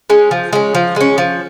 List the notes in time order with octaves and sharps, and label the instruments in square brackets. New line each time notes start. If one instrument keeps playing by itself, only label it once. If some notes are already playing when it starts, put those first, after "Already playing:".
[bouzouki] G#3 C#4
F3
G#3 C#4
F3
G#3 C#4
F3